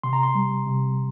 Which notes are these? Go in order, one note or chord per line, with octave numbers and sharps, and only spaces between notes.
C3 C6
A#5
C6
G3
C3